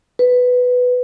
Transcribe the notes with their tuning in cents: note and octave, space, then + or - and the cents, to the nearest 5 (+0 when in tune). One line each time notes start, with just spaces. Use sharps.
B4 +5